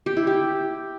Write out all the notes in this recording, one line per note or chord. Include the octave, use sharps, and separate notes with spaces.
G4
E4
G4